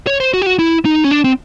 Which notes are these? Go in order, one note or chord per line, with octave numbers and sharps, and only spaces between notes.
C#5
C5
F#4
G4
F#4
E4
D#4
C#4
D4
C4